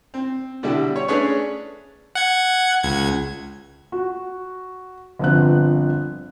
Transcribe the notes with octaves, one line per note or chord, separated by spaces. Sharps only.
C4
B2 D3 G3 E4
C#5
A3 C#4 D4 G#4 B4 C#5
F#5 G#6
C#2 G#6
F#4
G1 F3 B3 C4 F#6